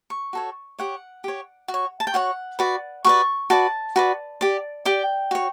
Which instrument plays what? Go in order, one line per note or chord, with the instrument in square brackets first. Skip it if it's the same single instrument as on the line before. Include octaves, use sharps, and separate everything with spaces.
[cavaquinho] C#6
F#4 A4 C#5
G4 C#5 F#5
G4 C#5
F#4
C#5
A5
G5
F#4 C#5 F#5
F#4 B4 D5
F#4 B4 D5 C#6
F#4 B4 D5 A5
F#4 B4 D5
G4 D5
G4 D5 G5
F#4 C#5